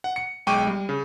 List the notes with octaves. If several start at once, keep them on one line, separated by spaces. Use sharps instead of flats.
F#5
C#7
B1 G#3 G5 C#6 D6 D#7
G3
C#3